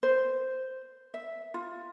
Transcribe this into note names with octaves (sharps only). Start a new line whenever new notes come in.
C5
E5
F4